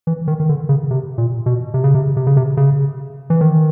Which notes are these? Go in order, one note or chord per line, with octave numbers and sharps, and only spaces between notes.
E3
D#3
D#3
D3
C#3
C3
A#2
B2
C3
C#3
C3
C3
C#3
C3
C#3
E3
D#3